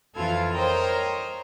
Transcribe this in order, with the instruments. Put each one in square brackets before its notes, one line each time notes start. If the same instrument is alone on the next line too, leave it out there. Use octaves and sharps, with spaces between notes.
[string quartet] F2 E3 F4 A4 F5 G#6
A#4 C5 C#5 D#5 G5 A#5